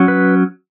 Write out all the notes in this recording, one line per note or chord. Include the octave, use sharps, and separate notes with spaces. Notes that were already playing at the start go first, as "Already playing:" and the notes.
Already playing: F#3 C#4
B4